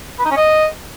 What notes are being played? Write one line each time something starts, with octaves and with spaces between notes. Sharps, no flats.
B4
D#4
C#4
D#5